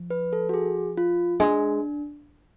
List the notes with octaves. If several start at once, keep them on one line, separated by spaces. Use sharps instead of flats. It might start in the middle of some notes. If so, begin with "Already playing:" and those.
Already playing: F3
B4
A4
F#4
G#4
F4
G#3 D4